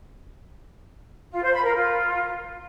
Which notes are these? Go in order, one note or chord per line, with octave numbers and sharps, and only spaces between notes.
F4
C5
B5
A#4
F4